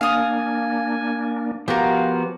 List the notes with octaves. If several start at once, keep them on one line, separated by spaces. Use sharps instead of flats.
A#3 D4 F5 G#5 D#6
F3 B3 F#4 G4 A#4 F5